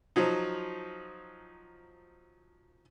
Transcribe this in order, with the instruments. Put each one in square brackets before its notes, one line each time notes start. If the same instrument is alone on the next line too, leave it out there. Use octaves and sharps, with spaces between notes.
[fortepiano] F3 F#3 D#4